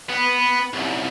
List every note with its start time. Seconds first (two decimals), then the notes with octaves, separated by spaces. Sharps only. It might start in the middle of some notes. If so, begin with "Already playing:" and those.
0.10 B3
0.73 C2 F#2